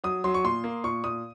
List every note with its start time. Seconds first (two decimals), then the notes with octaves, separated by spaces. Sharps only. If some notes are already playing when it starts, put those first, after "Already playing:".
0.04 F#3 D#6
0.24 F#3 C6
0.34 C#6
0.44 A#2 C6
0.64 A#3
0.84 A#2 C#6
1.04 A#2 D#6